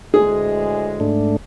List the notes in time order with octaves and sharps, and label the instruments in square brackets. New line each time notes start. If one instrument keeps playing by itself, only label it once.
[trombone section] D2 A2 G#3 [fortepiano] G#4
[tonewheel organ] G#2 A3 D4